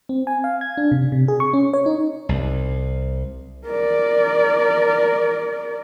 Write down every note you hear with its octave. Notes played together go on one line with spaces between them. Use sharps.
C4
G#5
F5
G#6
D4
C3
C3
G#4
C#6
C#4
C#5
D#4
C2
A#4 D5